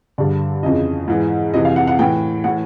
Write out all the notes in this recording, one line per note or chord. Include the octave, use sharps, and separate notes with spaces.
G2 D3 D5
F2 C#3 E3 D#5
G#2 E3
F2 C3 E3 D#5
F5
F#5
F#5
A2 E3 G5
A2 E3 F#5